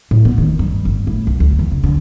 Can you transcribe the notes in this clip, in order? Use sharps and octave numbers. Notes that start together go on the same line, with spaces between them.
A2
B3
D#3
G2
G1
A2
B1
D2
E2
C#3
D3